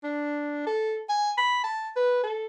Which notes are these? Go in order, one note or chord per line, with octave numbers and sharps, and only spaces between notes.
D4
A4
G#5
B5
A5
B4
A4